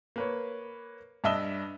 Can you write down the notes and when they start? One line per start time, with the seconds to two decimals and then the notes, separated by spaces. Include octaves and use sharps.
0.16 A#3 B4 C#5
1.24 G2 D4 D#5 E5 E6 G7